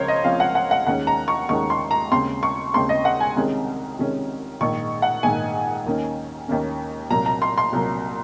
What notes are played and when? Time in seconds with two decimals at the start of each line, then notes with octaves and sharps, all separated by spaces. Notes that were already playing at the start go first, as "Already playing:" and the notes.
Already playing: C#2 C#3 F3 C4 A#4 C5 C#5
0.08 D#5
0.24 C#2 C#3 F3 C4 F5
0.40 F#5
0.55 F#5
0.71 F#5
0.87 D#2 D#3 G#3 C#4 F#5
1.07 A#5
1.28 C#6
1.49 D#2 D#3 G#3 C#4 C#6
1.70 C6
1.91 A#5
2.11 D#2 C#3 G#3 C4 C6
2.43 C#6
2.74 D#2 C#3 G#3 C4 C6
2.89 D#5
3.05 F#5
3.20 G#5
3.36 C2 C3 D#3 G#3 C#4
3.99 C2 C3 D#3 G#3 C#4
4.61 A#1 G#2 D#3 C#6
5.02 F#5
5.23 A#1 G#2 D#3 G#5
5.85 D#2 D#3 A#3 C#4
6.48 D#2 D#3 A#3 C#4
7.10 C2 A#2 F#3 A#3 A#5
7.26 A#5
7.42 C6
7.58 C6
7.73 C2 A#2 F#3 A#3